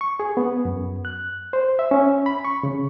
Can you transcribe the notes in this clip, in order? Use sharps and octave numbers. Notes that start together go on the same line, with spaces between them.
C#6
G#4
B3
F#2
F#6
C5
E5
C#4
B5
C#6
C#3